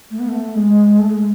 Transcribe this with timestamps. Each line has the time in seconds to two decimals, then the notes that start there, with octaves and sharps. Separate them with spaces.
0.11 A3
0.19 B3
0.28 A3
0.55 G#3
0.99 A3
1.10 G#3